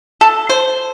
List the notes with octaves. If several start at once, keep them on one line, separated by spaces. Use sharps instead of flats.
A4
C5